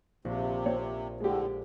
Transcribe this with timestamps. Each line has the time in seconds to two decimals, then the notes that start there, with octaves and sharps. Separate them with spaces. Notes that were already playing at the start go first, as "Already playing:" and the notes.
0.25 A#1 C3
0.66 C4 C#5
1.20 A2 D3 G#3 G4